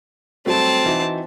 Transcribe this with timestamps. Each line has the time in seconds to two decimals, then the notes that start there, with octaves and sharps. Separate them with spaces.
0.46 F#3 G3 A3 C4 A5
0.86 E3 D#4 F#4